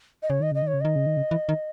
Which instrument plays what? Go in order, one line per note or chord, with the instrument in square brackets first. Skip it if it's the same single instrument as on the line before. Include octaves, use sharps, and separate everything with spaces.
[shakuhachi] D#5
[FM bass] C#3 [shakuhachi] C#5
[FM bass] D#3 [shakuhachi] D#5
[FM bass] C#3 [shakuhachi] D#5
[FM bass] D#3
[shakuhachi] C#5
[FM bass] C#3
[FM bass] D#3 [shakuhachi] D#5
[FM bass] C#3
D#3
C#3
E3
D#3